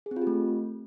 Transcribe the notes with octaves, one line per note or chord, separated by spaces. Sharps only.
G#4
C4
F4
G4
A3